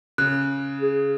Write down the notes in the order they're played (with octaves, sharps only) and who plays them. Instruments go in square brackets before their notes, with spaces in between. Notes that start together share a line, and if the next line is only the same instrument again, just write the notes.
[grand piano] C#3 [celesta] F#6
[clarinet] G#4